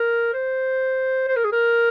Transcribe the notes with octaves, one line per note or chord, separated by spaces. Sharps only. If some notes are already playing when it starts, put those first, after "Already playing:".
Already playing: A#4
C5
C5
A#4
G#4
A#4